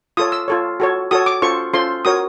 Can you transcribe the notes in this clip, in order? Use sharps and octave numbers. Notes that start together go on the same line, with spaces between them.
F4 A4 C#5 D#6
E6
F4 A4 C#5
F#4 A4 C#5
F#4 A4 C#5 D#6
D6
C#4 F4 A4 C5 C#6
C#4 F4 A4 C5 C6
F#4 A#4 C#5 D#6